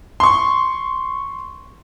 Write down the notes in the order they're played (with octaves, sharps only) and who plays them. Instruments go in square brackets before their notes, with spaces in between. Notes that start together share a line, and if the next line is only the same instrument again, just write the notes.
[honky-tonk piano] C6 C#6